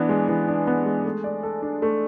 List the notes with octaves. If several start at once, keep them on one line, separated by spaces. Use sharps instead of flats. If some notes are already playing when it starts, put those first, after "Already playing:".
Already playing: E3 B3 D4
G#3
E3
D4
B3
G#3
A3
D5
A4
D4
A3